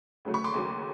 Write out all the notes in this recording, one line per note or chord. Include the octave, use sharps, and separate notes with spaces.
D2 C#3 F#3 A3
B5 C#6
C6 D6
D#2 C#3 F#3 A3